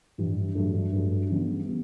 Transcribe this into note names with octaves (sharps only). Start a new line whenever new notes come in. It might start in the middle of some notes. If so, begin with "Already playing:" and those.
G2 E3 G3
G2 F#3 A3
G2 F#3 A3
C#3 E3 G3 B3
G3 B3